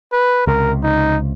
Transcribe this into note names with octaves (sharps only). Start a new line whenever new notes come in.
B4
C#2 C3 A#4
D#4